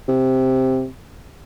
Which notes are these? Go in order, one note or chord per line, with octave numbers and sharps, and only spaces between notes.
C3